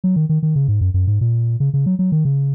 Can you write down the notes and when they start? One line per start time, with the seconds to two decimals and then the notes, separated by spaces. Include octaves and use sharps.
0.04 F#3
0.16 D#3
0.29 D#3
0.43 D#3
0.55 C#3
0.68 G#2
0.81 F#2
0.94 F#2
1.07 G#2
1.21 A#2
1.60 C#3
1.74 C#3
1.86 F#3
1.99 F#3
2.12 D#3
2.25 C#3